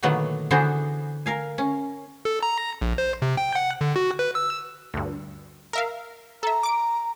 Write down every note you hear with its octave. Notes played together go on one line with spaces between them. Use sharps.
A#2 D3 D#3 F#3 A3 B3
D3 E3 B3 F#4 G#4 C5
A#4 F5 G#5
C#4
A4
A#5
A#1
C5
C3
G5
F#5
D3
F#4
B4
E6
D2 G2
A#4 E5 F5
A4 E5 A#5
D6 D7